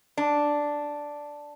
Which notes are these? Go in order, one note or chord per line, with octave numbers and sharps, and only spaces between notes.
D4